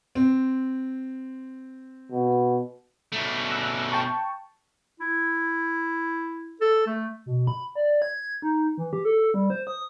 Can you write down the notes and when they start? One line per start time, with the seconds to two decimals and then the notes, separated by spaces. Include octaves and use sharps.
0.15 C4
2.12 B2
3.12 B2 A3
3.51 E6 F#6 A#6
3.92 G5 A5 C#6
5.00 E4
6.61 A4
6.86 A3
7.26 B2
7.47 B5
7.75 D5
8.02 G#6
8.42 D#4
8.78 E3
8.93 G4
9.05 A4
9.34 G3
9.50 C5
9.67 D#6